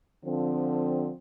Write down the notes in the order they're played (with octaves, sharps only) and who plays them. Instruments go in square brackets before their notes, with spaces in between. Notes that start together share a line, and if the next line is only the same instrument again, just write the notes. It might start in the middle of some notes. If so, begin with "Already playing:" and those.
[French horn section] D3 F3 C4